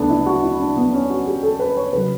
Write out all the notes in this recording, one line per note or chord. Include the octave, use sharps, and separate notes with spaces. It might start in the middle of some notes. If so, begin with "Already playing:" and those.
Already playing: D2 C#3 A3 B3 D4
E4
F#4
E4
D4
B3
C#4
F#4
G4
A4
B4
C#5
C#3 F#3 B4